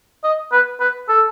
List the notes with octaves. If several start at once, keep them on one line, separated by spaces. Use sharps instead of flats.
D#5
B4
B4
A4